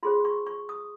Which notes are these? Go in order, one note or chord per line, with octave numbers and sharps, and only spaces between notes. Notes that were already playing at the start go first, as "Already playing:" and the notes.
F4 G#4 C5 C6
C#6
C#6
D#6